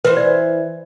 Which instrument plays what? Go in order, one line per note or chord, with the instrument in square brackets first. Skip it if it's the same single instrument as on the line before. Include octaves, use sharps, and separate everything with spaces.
[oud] E3 C5 [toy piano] B4
[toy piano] D5